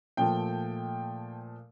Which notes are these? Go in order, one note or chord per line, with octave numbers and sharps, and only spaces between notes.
A#2 F3 A3 G5